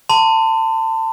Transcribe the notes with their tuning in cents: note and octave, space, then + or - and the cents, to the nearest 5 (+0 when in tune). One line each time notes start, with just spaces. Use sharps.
A5 +25 C6 -35